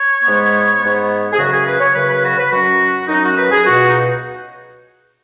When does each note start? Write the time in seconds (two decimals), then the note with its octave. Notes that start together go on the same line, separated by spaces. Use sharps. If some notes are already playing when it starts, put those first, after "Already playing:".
Already playing: C#5
0.24 G#2 G#3 B3
0.81 G#2 G#3 B3
1.33 G#4
1.38 F#2 C#3 F#3 C#4 F#4
1.52 G#4
1.66 B4
1.80 C#5
1.95 F#2 C#3 F#3 C#4 B4
2.10 B4
2.24 F#4
2.37 B4
2.52 F#2 F#3 C#4 F#4
3.08 F#2 F#3 C#4 D#4
3.23 F#4
3.37 B4
3.51 G#4
3.65 C#2 B2 B3 F#4
3.88 D#4